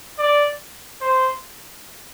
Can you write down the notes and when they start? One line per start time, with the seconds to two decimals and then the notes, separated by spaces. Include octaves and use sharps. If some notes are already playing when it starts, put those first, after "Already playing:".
0.18 D5
1.01 C5